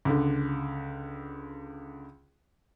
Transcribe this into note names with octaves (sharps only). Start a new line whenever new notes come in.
C#2 D3